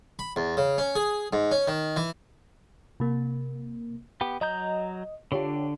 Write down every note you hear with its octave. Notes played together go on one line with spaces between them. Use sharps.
B5
E2
C#3
C#4
G#4
G#2
C#4
D#3
E3
C3 A#3
B3 G4
F#3 D#5 A#5 G6
D3 D4 F4 G4 C#5